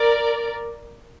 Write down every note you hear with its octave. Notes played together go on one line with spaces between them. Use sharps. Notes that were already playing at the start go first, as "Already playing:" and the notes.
Already playing: A#4 D5